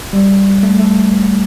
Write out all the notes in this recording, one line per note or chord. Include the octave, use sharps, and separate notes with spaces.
G3
A3
A3